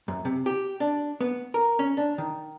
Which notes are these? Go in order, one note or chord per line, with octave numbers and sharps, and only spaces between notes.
F#2
C3
G4
D4
B3
A#4
C#4
D4
D#3